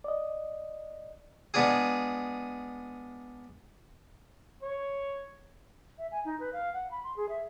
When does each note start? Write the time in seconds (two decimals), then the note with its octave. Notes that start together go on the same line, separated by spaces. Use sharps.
0.04 D5 D#5
1.54 G#3 B3 D4 F4 G#4
4.63 C#5
5.98 E5
6.12 G#5
6.25 D#4
6.40 B4
6.53 F5
6.74 F#5
6.91 B5
7.04 C6
7.16 G#4
7.29 E5